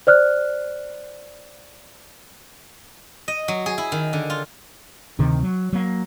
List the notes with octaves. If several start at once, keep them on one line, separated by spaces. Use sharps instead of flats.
C5 D5 F6 F#6
D#5
F#3
G#4
E4
D#3
D3
F4
D2 C3 D#3
F#3
F#3 A#3